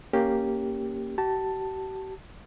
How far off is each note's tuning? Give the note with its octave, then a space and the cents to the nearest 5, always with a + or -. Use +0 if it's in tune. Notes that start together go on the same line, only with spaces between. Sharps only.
A#3 +0 C#4 +0 G4 +0
G4 -45 A5 +5